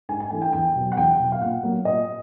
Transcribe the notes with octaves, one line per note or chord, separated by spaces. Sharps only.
G#2 G#5
G#5
E3 A3 G#5
G5
E2 G5
B2 F#3
F#5
E2 G5
B2 F#3
F5
A#2 F#5
F#3 A#3
A#2 D#5